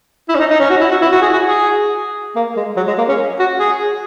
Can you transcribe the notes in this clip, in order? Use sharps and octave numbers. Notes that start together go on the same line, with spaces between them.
E4
C#4
D#4
D#4
C#4
F#4
E4
F#4
E4
F#4
G#4
F#4
G#4
A#3
G#3
F#3
G#3
A#3
C#4
F#4
G#4